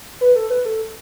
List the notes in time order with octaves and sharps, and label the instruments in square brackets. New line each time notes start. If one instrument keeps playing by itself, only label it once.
[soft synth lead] B4
A4
B4
A4